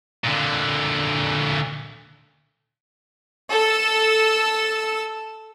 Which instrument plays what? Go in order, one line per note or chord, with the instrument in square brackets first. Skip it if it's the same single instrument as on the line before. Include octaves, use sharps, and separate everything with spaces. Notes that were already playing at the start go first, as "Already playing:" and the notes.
[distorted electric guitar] A#2 D3
[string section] A4 E6